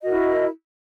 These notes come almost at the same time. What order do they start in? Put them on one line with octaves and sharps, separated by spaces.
D#5 F#4 A#4 E4